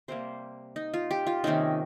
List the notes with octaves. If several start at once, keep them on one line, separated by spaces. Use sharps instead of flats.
C3 G3 A#3 C5
D#4
F4
G4
F4
C3 D#3 A#3 C#4 D#4